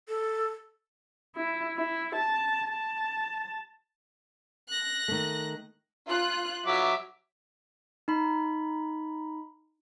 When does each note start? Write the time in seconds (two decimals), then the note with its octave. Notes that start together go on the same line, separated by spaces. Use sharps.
0.09 A4
1.36 E4
1.77 E4
2.15 A5
2.68 A5
4.68 F#6 A#6
5.08 D#3 A3
6.08 F4 F#6
6.66 F#3 E5 D6
8.08 D#4 B5